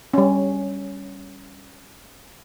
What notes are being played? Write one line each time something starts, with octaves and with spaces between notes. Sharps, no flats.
G3 C#4